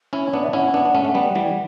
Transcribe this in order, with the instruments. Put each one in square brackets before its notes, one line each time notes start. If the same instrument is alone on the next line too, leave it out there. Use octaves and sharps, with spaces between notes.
[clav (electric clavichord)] C#4 E4
[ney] C#5
[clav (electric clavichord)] B3 D4 [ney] D5
[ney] E5
[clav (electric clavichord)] C#4 E4 [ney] F#5
[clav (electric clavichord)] B3 D4
D4
A3 C#4
A3
[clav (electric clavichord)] G3 B3 [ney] F#5 G5
[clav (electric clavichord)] E3 G3